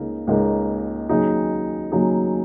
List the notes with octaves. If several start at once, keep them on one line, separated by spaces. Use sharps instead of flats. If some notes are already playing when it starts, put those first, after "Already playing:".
Already playing: C#2 C#3 A#3 D#4 A#4
C#2 C#3 A#3 D#4 A#4
D#2 C#3 F#3 D#4 G#4
D#2 C#3 F#3 D#4 G#4